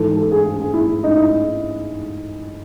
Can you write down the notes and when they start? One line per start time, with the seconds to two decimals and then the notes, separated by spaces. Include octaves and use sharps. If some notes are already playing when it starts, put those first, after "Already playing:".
Already playing: G#2 E3 A4
0.17 A4
0.31 G#4
0.46 G#4
0.60 G#4
0.74 E4
1.04 D#4
1.17 E4